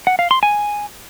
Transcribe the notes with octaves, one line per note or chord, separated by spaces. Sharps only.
F#5
F5
C6
G#5